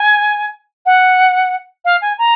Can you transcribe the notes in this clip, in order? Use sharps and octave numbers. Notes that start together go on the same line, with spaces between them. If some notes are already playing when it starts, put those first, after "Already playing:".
Already playing: G#5
F#5
F5
G#5
A#5